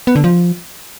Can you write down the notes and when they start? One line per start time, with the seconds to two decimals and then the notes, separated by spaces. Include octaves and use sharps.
0.07 B3
0.16 D3
0.24 F3